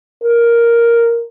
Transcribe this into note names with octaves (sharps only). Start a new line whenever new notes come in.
A#4